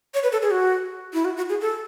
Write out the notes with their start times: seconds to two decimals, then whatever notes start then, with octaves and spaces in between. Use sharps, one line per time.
0.14 C#5
0.23 B4
0.32 A4
0.42 G#4
0.51 F#4
1.14 E4
1.25 F#4
1.37 F#4
1.49 G#4
1.61 A4